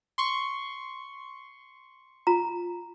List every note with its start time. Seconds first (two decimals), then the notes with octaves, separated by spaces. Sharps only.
0.18 C6 C#6
2.27 F4 A#5